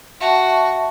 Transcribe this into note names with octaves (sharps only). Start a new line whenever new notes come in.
F#4 E5 A5 C#6